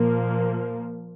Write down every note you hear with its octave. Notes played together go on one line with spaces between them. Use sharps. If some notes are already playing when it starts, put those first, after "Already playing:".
Already playing: A#2 F3 A#3